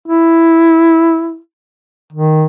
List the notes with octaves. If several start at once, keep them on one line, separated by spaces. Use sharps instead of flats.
E4
D#3